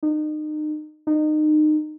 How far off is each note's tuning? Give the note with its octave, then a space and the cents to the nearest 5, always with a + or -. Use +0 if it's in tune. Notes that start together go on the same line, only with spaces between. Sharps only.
D#4 -35
D#4 -30